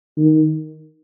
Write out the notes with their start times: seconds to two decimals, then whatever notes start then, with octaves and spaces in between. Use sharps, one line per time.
0.18 D#3